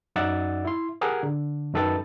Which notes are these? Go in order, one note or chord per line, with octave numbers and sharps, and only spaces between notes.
F#2 D#4 D5 E5 F#5 A6
E4 C6
G4 G#4 A#4 F#5 G#5
D3
F#2 D#3 A4 B4 G5 A6